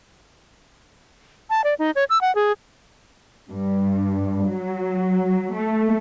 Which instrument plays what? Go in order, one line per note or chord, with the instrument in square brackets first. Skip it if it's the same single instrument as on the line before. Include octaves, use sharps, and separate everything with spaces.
[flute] A5
D5
D#4
C#5
E6
F#5
G#4
[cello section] G2
F#3
A3